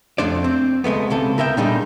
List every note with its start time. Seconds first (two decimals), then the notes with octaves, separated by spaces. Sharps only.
0.18 F2 A3 D4 C5 D5
0.44 C4
0.84 C#2 G#3 A3 B3
1.10 C#2 C3 A4
1.38 B3 A#4 E5 G5
1.57 A#2 D3 G3 D4 D#4 G#4